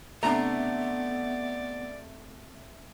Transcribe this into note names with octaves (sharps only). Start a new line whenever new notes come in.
C3 A3 B3 D4 D5 A#5